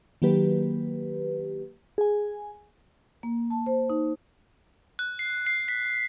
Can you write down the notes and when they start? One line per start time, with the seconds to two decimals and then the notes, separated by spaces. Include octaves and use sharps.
0.22 D#3 F#3 A#3 G4 B4
1.98 G#4 G#5
3.23 A#3
3.50 A5
3.66 C5
3.90 D#4
4.99 F#6
5.19 C7
5.47 C7
5.68 B6